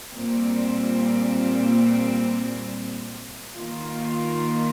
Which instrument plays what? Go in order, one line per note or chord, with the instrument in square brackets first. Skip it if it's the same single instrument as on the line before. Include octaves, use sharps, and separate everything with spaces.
[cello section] A#2 G3 C4
D#3 A#3 F4